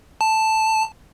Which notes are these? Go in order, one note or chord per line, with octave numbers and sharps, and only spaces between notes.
A5